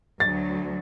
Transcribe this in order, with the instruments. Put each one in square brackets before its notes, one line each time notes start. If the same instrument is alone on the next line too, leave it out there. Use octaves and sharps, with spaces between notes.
[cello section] D2 F#3 [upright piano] A6